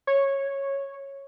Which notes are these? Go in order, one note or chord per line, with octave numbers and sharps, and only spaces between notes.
C#5